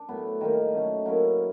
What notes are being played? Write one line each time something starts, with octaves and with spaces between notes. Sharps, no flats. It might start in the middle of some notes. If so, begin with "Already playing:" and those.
Already playing: D4
A2 F#3 B3
D#3 G3 A#3 D#4
F#3 A3 C#4
F#3 A#3 C#4 E4